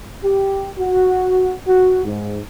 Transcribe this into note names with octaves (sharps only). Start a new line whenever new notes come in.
G4
F#4
F#4
G#2